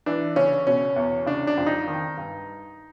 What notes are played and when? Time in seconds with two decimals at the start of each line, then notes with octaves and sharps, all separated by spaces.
0.06 E3 D4
0.36 C#3 C#4
0.67 B2 C#4
0.96 E2
1.26 C#3 D4
1.47 D4
1.58 F2
1.66 D#4
1.88 D#3
2.17 G2